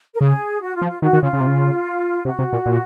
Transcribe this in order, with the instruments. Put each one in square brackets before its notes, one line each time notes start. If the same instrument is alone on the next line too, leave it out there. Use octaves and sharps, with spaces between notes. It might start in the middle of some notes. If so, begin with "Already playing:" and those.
[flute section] A#4
[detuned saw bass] C#3 [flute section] G#4
[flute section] F#4
F4
[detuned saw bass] F3
[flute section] F4
[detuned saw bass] D#3 [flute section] F#4
[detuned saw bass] D#3
[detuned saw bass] C#3 [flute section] F4
[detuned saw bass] C#3
C3
C#3
[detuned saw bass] C3 [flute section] F#4
[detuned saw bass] C3
A#2
A#2